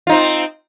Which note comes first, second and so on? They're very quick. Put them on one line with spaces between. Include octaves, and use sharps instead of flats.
F4 D#4 C4